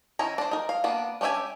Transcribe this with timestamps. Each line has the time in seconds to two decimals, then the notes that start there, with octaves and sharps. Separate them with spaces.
0.19 D#3 C#4 E4 A#5
0.38 D4 C5
0.51 D#4 A#4
0.69 F5
0.84 A#3 B3 D4
1.21 C#4 D4 G4 E5 G#5